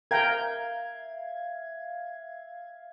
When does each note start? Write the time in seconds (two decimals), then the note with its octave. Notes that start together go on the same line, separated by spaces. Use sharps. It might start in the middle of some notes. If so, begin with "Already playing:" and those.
0.11 A#4 E5 F5 G5 A#5 G#6